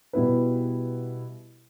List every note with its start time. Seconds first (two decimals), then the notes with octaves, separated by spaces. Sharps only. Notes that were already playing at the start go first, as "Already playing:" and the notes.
0.13 B2 G3 B3 E4 B4